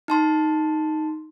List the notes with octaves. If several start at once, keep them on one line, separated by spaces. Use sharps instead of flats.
D#4 A5 C6